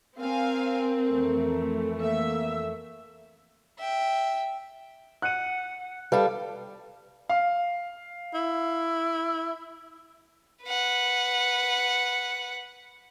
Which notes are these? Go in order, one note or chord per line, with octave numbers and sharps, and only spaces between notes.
C4 A#4 F5 G#5
F2 E3 A3
A#3 E5
E5 G5
F#5 F#6 D#7
G3 A4 B4 F5
F5
E4
B4 F#5